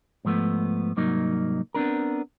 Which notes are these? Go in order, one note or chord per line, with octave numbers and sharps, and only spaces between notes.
G#2 F3 A3 B3
C2 G#2 F#3 A#3 D#4
B3 C4 D4 A#4